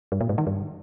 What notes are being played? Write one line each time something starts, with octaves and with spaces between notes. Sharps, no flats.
G2
A#2
G#2
D#3
G2